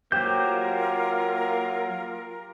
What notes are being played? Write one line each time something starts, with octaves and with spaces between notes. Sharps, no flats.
F#3 A#3 F4 G4 A#4 C5 G6